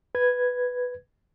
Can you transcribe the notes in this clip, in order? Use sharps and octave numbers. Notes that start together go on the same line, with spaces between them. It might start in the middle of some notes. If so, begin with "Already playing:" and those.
B4 G#6